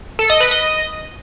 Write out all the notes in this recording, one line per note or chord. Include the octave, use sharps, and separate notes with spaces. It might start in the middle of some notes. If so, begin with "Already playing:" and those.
A4
D#5
B4
D#5